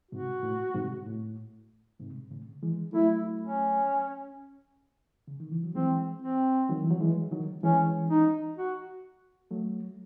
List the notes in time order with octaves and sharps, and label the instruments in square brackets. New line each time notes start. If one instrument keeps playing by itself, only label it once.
[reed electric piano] G#2 C3 [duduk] F#4
[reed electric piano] A2
G#2 C3
A2
G#2 C3
A2 C#3
E3 G#3
[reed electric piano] F#3 A3 [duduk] E4
[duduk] C#4
[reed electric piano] C#3
D#3
E3
F#3
[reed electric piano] E3 G#3 [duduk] C4
[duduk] C4
[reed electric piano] D#3 F#3
E3
F#3
E3 G#3
D#3 F#3
[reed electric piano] E3 G#3 [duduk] C#4
[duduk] D#4
F#4
[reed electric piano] F#3 A3